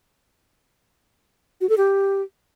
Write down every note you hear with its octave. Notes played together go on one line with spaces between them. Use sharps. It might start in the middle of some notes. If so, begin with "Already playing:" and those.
F#4
A4
G4